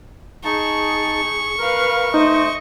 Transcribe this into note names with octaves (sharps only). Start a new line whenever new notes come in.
D#4 G#4 A5 C#6
A#4 B4 F5
A3 D#4 C5 D#5